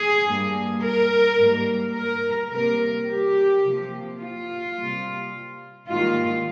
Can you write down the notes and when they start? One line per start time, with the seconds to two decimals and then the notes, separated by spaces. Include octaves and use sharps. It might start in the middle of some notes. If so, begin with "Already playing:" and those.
Already playing: G#4
0.25 G2 G3 A#3
0.82 A#4
1.38 G#2 G3 A#3
1.94 A#4
2.51 C3 G3 A#3 A#4
3.08 G4
3.64 C3 F3 A#3
4.19 F4
4.76 C3 G3 A#3
5.89 G#2 D#3 G3 A#3 F4